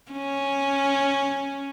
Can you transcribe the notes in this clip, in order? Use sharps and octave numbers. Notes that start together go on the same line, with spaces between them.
C#4